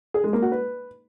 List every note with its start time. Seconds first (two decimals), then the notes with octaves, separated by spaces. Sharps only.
0.14 G#4
0.24 G#3
0.33 A#3
0.42 F#4
0.52 B4